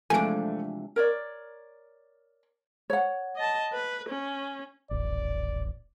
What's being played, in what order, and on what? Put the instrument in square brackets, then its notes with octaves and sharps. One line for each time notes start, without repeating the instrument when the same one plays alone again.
[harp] C3 E3 G#3 [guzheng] F3 D4 [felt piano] A3 [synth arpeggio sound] G#5 D7
[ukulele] A#4 C#5 D5
C#5 F#5
[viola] D#5 A5
B4
C#4
[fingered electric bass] D#1 A1 [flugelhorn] D5